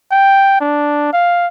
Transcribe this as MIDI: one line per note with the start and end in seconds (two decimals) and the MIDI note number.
0.12 0.58 79
0.61 1.10 62
1.13 1.47 77